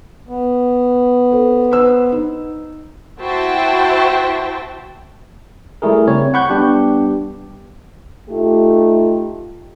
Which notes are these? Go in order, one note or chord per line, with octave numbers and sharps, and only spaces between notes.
B3
A4 C5
B4 C5 E6
D#4
E4 F#4 C5 E5 G5 A5
G3 A3 E4 G#4 A#4
C#3 C4 C#5
F#5 B5 C#6 F#6 G6
G3 B3 D4 G4
A3 D#4 F4 G4